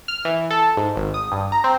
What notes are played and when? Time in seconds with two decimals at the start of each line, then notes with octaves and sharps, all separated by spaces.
0.08 F6
0.25 E3
0.51 A4
0.77 G#2
0.96 G#1
1.14 D#6
1.32 G2
1.52 A#5
1.64 C4